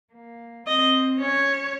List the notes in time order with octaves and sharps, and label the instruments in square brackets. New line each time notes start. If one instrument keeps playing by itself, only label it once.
[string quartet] A#3
[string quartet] C4 [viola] D#5
[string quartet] C#4 [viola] C#5